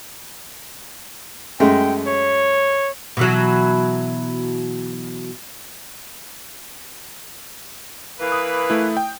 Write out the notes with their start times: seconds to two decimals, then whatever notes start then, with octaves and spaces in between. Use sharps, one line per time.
1.60 F#2 G#3 A3 G5
2.07 C#5
3.17 B2 E3 F#3
8.19 E3 A#3 B4
8.32 D#6
8.70 A3 E4
8.97 G5